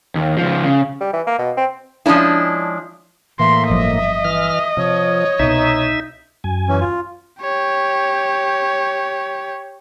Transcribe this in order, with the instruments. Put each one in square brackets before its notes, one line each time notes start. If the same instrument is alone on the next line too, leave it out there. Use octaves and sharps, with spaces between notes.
[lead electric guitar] D#2
C#2 F3
C#3
[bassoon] G3
E3
A#3
B2
C4
[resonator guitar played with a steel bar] F3 G#3 C#4 D4 E4
[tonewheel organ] A2 A#3 [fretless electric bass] E3 [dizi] E5 [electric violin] C6
[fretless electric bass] G1 F3 F#3 [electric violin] D#5
[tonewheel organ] E3 F6
[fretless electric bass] C3 [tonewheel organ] F3 [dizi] C#5
[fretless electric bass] C2 B2 [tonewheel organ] D#4 E5
[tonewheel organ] F#2 G#5
[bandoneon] E3 C#4
F4
[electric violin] G4 C#5